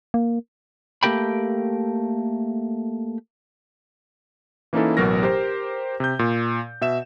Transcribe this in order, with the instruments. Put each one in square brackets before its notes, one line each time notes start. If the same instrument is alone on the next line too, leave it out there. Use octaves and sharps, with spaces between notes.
[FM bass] A#3
[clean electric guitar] A3 A#3 G4 A#4 G5 B5
[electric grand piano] E3 A#3 C#4 D#4 E4 A4
A1 B2 F#3 F#4 A#4 A#6
G4 A#4 C5
C3 G6
A#2
B2 E5 E7